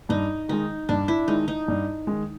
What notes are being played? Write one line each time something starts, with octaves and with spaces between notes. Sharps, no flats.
G2 D#4
D#3 G#3 D#4
G2 D4
E4
D#3 G#3 D#4
D#4
G2
D#3 G#3